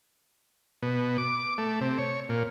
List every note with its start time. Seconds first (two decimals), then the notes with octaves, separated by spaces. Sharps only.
0.82 B2
1.18 D6
1.58 A3
1.81 C3
1.98 C#5
2.29 A#2